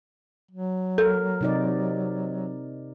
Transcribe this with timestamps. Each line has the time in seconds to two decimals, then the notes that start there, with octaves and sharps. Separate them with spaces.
0.51 F#3
0.98 A4 A#4
1.41 C3 D#4 D5